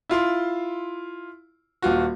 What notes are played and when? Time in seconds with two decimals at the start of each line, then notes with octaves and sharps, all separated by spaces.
0.09 E4 F4 C6
1.82 D#1 F4 F#4